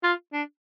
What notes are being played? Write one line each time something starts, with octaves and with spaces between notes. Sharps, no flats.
F4
D4